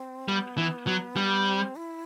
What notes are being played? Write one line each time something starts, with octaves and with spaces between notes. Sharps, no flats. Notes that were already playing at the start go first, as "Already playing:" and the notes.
Already playing: C4
G3 B3
E3
F#3
G3
C4
E4